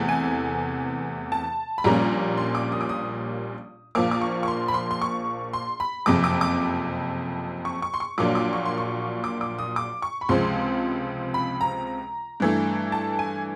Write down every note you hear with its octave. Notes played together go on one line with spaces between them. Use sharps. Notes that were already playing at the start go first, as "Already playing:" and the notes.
Already playing: E2 C3 E3 A3
G#5
A5
B5
A#1 A#2 G3 A#3 C#4 A#5
C6
D6
D#6
D6
D#6
A#1 A#2 F3 A#3 D6
D6
C#6
C#6
C6
B5
C6
C6
C#6
C6
B5
F#1 F2 C3 D6
D6
D6
C#6
C#6
C6
C#6
A#1 A#2 F#3 A#3 D4 D6
D6
C#6
C6
C#6
D6
D6
D#6
D6
C#6
B5
C#2 C3 F3 G#3 C4 C6
B5
A#5
G2 E3 A3
A5
G#5